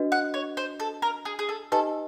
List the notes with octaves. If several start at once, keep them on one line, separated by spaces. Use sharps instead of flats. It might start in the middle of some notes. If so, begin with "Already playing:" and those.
Already playing: D4 F#4 B4 D#5
F#5
C#5
C5
A4
A#4
G#4
G#4
A4
D#4 G4 A4 B4 D#5 G#5